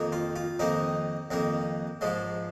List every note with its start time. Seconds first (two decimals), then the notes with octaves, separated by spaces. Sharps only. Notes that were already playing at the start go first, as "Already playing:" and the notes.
Already playing: F2 D#3 A#3
0.12 F4
0.36 F4
0.59 F2 D#3 A#3 D#4
1.31 F2 D#3 A#3
2.01 G#2 F3 G#3